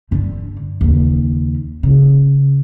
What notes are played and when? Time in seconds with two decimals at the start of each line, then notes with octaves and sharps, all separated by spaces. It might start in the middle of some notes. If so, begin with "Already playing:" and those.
0.11 G2 D3
0.81 D#2 C#3
1.83 C#3